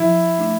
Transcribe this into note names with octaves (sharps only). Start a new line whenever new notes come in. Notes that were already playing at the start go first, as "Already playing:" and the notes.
Already playing: F3 E4
A3 D4